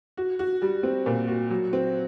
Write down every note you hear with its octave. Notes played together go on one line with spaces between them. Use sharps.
F#4
F#4
G3
C4
A#2
F#4
F#3
C4